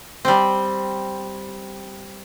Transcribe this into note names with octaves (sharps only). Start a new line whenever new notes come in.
G3 C4